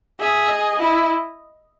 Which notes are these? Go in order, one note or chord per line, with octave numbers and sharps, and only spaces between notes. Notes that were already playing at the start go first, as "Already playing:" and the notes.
G#4 E5
D#5
E4